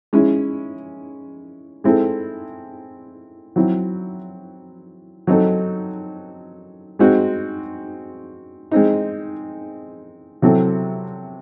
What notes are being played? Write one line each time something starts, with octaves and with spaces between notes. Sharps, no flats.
G#3 C#4 E4
G#3 C4 E4 A4
F#3 C4 E4
F#3 C4 D#4 A4
G#3 C4 D#4 F#4
G#3 C4 D#4
C3 F#3 C4 E4 A4